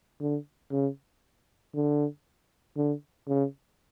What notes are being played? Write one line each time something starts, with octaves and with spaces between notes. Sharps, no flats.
D3
C#3
D3
D3
C#3